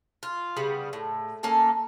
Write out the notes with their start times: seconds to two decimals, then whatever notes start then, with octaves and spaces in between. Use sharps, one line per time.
0.23 F4
0.57 C#3 G3 B3
0.93 A2
1.43 A#3 C#4 A4 A5